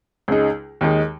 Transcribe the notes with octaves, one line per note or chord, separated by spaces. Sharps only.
C#2 C#3 G#3 D#4
D#2 D#3 G#3 D#4